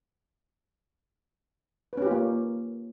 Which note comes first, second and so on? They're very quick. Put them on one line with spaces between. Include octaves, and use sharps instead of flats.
B4 C#4 G4 F4 A#3